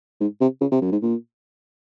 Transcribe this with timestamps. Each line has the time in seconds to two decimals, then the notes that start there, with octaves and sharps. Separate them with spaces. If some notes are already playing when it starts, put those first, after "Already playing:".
0.20 G#2
0.41 C3
0.61 C#3
0.72 C3
0.82 F#2
0.92 G#2
1.02 A#2